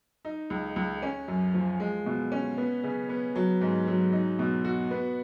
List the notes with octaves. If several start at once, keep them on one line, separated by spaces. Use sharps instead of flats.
D#4
C#2
C#2
C#4
F#2
F3
G#3
B2
C#4
B3
C#3
B3
F#3
G#2
F#3
D#4
B2
F#4
B3